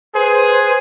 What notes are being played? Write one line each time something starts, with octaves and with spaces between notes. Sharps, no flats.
G#4 B4 C5